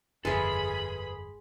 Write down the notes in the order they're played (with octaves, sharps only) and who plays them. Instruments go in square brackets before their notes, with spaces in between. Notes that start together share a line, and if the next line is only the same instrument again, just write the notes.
[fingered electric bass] G1 F2 [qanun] G#3 E5 [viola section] G#4 B5 [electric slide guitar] A4 B4